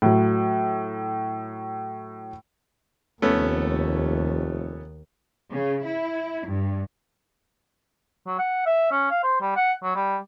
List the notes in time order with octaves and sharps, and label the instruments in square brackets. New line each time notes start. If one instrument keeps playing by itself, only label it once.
[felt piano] A2 F#3
[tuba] F1 [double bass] D#2 [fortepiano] A3 B3 C#4
[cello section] C#3
E4
G2
[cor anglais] F#3
F#5
E5
C#4
F5
C5
G3
F#5
F#3
G3